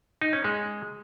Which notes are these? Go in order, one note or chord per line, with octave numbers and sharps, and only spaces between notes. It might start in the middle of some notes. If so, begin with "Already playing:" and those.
D#4
C#4
G#3